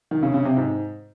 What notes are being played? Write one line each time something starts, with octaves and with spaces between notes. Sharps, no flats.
D#3
C#3
C#3
C3
G#2